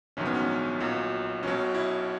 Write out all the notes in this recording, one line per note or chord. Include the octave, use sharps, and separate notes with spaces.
A#1 G#2 D#3 F#3 C#4
B3
C#4
B1 A#2 F#3
B1 B2 F#3 C#4
E4